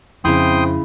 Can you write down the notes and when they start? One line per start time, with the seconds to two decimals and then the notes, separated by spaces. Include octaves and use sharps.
0.25 F2 C#3 C4 E4 G5 C6 D#6